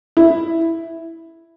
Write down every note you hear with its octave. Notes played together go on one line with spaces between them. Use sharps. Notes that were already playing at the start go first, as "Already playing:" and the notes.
E4